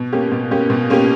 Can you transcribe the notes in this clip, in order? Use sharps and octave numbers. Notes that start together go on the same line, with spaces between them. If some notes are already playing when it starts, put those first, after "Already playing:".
Already playing: B2
A#3 C#4 G4
B2
A#3 C#4 G4
B2
A#3 C#4 G4